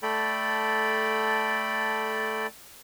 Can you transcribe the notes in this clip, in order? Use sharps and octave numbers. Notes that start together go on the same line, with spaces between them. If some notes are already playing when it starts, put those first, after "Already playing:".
A3 A4 D5 G5 B5